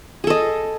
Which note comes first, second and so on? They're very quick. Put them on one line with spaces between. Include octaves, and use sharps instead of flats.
G#4 A4 D#5